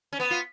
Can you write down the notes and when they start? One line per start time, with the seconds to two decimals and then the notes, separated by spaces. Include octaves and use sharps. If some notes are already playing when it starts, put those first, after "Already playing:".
0.13 C#4
0.20 B3
0.31 F4